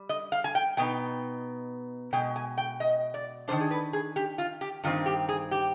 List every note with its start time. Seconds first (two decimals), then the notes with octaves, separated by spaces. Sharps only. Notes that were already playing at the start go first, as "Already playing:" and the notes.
Already playing: G3
0.09 D#5
0.32 F5
0.44 G#5
0.55 G5
0.77 B2 B3 D#4 G5
2.13 B2 G#3 G5
2.36 G#5
2.58 G5
2.80 D#5
3.14 D5
3.48 D#3 G3 D4 C5
3.60 G#4
3.71 B4
3.93 G#4
4.16 G4
4.38 F4
4.61 G4
4.84 G2 D#3 C4 F4
5.06 G4
5.29 G#4
5.51 G4